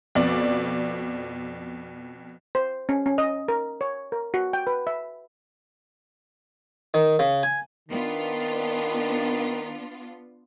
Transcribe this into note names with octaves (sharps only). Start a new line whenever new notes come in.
F2 B2 D5
C5
C#4
C#4
D#5
A#4
C#5
A#4
F#4
G5
B4
E5
D#3
C#3
G#5
D#3 B3 D4 F4